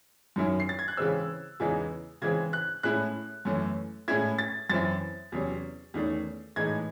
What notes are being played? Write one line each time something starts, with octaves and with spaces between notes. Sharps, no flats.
F#2 D#3 F#3 C#4 E4
C7
A6
G#6
F#6
C#3 E3 G#3 C4 E6
E2 C#3 E3 G#3 D#4
C#3 E3 G#3 C4 G#6
F#6
A2 G#3 C#4 E4 F#6
F#2 E3 A3 C#4
A2 G#3 C#4 E4 G#6
A6
F#2 E3 C4 E4 A6
E2 C3 F#3 C#4
E2 D#3 A3 C#4
A2 E3 G#3 D#4 G#6